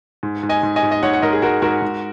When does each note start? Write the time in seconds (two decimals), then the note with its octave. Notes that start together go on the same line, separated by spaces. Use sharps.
0.23 G#2
0.43 G#2
0.49 D#5 G#5
0.63 G#2
0.76 D#5 G#5
0.83 G#2
0.91 D#5
1.03 G#2 C#5 F#5
1.13 F#5
1.22 G#2 A#4 D#5
1.33 G#4
1.42 G#2 F#4 A#4
1.62 G#2 F#4 A#4
1.82 G#2